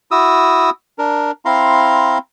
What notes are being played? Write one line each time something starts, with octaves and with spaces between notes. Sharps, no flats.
E4 F#4 D#6 E6
D4 A#4
C4 E4 F5 A#5 C6